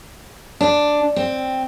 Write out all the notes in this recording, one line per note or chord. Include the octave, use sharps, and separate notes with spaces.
D4
C4